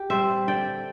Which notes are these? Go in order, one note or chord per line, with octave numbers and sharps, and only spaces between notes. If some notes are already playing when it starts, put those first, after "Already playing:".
Already playing: G4
G3 C4 C5 E5
D3 D5 G5